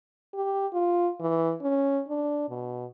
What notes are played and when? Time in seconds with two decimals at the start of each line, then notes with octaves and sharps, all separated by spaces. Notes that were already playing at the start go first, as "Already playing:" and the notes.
0.34 G4
0.73 F4
1.20 E3
1.62 C#4
2.09 D4
2.49 B2